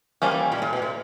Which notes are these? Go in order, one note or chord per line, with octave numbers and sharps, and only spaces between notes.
F3 G3 A#3 C#4
E3
A#2
A2
B2
A2